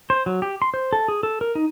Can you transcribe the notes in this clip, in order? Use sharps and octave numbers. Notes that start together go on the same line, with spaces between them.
C5
F#3
G4
C6
C5
A4
G#4
A4
A#4
D#4